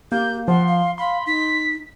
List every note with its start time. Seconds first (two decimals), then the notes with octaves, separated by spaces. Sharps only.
0.12 A#3 G4 G6
0.48 F3 F#5 C6
0.68 F5
0.98 F5 B5 C6
1.27 D#4 B6